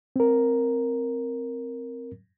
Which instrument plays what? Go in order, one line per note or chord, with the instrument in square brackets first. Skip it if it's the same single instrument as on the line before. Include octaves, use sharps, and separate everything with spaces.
[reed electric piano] C4 A#4